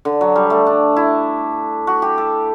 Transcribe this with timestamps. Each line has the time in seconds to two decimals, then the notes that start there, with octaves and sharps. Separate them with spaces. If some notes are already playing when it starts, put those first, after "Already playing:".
0.05 D3
0.21 F#3
0.36 G3
0.50 A3
0.66 D4
0.96 E4
1.87 F#4
2.02 G4
2.18 A4